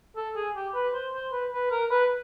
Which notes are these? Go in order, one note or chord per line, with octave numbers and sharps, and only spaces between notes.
A4
G#4
G4
B4
C5
C5
B4
B4
A#4
B4